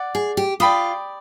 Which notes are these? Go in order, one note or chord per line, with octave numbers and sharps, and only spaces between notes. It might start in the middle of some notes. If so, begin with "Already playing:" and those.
Already playing: D5 F#5
G#4
G4
F4 D5 G5 B5 D#6